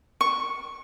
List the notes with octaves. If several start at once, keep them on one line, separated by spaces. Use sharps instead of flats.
C#6